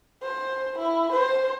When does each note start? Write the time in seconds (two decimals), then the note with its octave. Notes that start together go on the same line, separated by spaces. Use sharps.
0.22 C5
0.78 E4
1.12 C5